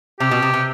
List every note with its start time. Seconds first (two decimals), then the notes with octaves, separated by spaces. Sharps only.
0.20 C3 G4
0.31 B2
0.42 C3
0.54 C3